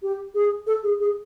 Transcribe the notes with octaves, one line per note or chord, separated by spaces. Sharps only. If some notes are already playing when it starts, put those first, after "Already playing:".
G4
G#4
A4
G#4
G#4